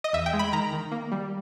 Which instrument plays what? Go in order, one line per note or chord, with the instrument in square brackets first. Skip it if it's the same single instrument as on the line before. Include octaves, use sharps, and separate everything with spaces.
[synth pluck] D#5
E2 E5
G5
G#3
B5
D#3 A#5
D#3
A#3
G3